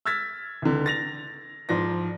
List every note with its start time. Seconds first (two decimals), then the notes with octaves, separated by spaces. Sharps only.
0.05 E6 F6 G#6 A6 B6
0.62 C#2 D3
0.86 A6 A#6 F7
1.69 G#2 F3 D5 A#6